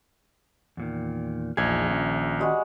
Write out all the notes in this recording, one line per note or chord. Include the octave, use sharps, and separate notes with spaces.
E2 A#2 D#3
A#1 E2 D#4 G#4 G#6
D#3 C#4 E5
G3 G#3 F#4